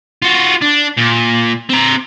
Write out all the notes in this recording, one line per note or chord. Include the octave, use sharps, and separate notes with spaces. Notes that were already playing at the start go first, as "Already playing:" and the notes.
F4 F#4
D4
A#2
C4 A#5